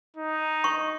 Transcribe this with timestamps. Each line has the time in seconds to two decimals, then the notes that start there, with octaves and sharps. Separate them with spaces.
0.16 D#4
0.64 C#6